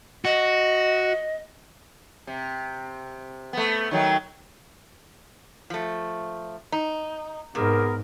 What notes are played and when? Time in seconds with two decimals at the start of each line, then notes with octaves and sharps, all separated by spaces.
0.25 F#4 D#5
2.27 C3
3.53 A3 B3
3.91 D#3 F#3 A3
5.70 F3 A3
6.72 D#4
7.55 G#2 C3 B3 G#4 A#4